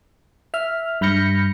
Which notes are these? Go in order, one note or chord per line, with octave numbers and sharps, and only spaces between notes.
E5 F6
G2 B5 F6 G6 A#6 C#7